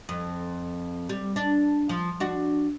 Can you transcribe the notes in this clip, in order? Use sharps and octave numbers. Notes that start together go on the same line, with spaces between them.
F2
G3
D4
F3
D4 F#4